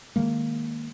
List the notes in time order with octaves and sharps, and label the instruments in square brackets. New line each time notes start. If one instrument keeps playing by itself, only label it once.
[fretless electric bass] D#3 G#3 A#3